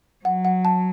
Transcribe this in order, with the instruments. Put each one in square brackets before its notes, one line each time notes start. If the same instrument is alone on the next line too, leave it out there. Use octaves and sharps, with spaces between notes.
[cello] F#3 [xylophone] F#5
[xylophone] F#5
A5